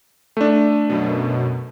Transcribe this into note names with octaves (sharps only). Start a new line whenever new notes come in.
A3 D4
F#2 B2